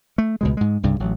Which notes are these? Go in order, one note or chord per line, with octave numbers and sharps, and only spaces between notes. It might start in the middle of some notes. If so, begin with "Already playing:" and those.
A3
C#2 B2 G#3
G#2 G#3
C2 G2 C#3
A1 F#3